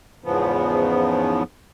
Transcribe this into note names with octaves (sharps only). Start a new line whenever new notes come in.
E2 G#2 C#3 F3 B3